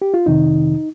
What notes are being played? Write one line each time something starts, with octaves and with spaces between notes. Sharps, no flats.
G4
F4
F2 C3 D#3 D#4